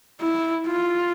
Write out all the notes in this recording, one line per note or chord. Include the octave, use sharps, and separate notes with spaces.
E4
F4